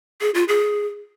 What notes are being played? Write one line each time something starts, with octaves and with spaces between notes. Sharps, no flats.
G#4
F4
G#4